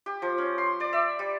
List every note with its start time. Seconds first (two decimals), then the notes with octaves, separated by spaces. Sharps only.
0.06 G4
0.22 F3
0.38 C#4
0.58 C6
0.80 D5
0.93 E5
1.19 G3